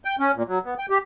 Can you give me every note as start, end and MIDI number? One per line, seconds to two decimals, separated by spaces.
0.05 0.16 79
0.19 0.32 61
0.35 0.43 46
0.48 0.59 54
0.65 0.74 59
0.78 0.86 79
0.90 0.98 67